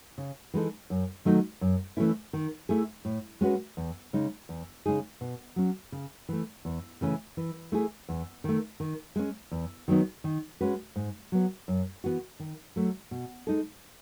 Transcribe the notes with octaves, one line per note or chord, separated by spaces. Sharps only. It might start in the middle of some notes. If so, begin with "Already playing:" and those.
C#3
E3 G#3 D#4 A4
F#2
D#3 F#3 A3 D#4
F#2
E3 A3 C#4 E4
D#3
A3 E4 G#4
A2
G#3 C#4 F#4 B4
E2
C#3 G#3 D#4
E2
C#3 G#3 D#4 G#4
B2
F#3 C#4
C#3
E3 A3
E2
C#3 E3 A3 C#4
E3
A3 E4 G#4
E2
D#3 A3
D#3
G#3 C#4
E2
D#3 F#3 B3 D#4
D#3
G#3 C#4 F#4 B4
G#2
F#3 B3
F#2
E3 B3 F#4
D#3
F#3 A3
B2
G#3 D#4 A4